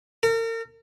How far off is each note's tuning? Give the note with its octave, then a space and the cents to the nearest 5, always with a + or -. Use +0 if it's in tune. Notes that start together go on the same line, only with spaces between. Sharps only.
A#4 -40